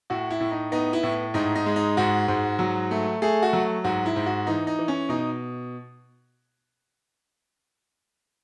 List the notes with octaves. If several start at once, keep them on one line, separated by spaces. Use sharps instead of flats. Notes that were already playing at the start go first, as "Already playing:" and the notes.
A2 F#4
E4
A2
D#4
B3 D#4
E4
A2
G#2 D#4
D#4
G#3
D#4
G#2 F#4
G#2
F#3
A3
A3 G#4
F#4
F#3
G#2 F#4
E4
G#2
F#4
E3 D#4
D#4
E3
C#4
B2 D#4